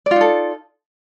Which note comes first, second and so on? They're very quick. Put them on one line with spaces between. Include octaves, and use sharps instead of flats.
D5 F4 D#4 A4